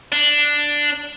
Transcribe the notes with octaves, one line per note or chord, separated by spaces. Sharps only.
D4